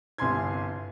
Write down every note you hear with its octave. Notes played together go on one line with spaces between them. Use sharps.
G1 C2 G#5 C6 G#6